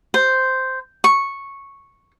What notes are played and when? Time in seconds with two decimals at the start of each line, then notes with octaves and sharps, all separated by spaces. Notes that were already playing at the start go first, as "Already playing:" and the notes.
0.14 C5
1.04 C#6